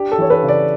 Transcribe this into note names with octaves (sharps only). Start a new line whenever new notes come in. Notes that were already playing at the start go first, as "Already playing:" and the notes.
Already playing: D4 G4
A4
E3 C#5
B4
C#3
D5